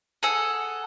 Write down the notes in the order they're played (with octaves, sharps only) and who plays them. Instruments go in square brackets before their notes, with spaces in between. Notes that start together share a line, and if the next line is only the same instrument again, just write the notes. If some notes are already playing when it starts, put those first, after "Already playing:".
[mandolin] G#4 A4 F#5